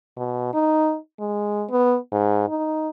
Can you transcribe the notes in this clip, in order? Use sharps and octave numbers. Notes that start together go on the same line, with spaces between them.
B2
D#4
G#3
B3
G#2
D#4